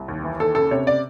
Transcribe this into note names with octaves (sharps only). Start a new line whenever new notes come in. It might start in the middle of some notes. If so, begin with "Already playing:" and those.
Already playing: C2
D#2
E3
D#2 A4
C#3 A4
C3 C#5
D5